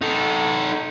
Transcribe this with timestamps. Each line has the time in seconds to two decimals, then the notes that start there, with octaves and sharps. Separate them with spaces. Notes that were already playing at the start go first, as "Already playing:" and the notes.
0.01 D#4 A4